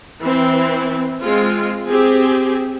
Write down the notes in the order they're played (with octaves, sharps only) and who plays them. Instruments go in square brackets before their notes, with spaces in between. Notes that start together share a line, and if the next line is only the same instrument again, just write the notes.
[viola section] E3 C4
G#3 C4 F4
C4 G4 G#4